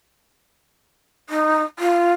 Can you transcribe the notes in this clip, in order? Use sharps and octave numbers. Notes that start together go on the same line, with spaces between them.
D#4
F4